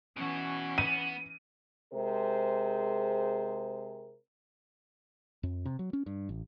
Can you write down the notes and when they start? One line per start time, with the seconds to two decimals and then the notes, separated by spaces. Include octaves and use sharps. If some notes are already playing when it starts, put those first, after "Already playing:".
0.17 B2 E3 C#4 F#4
0.78 B3 D#7
1.93 C3 G#3 G#4 A#4 C5
5.43 F2
5.65 C3
5.79 F#3
5.93 C#4
6.06 G2
6.29 A1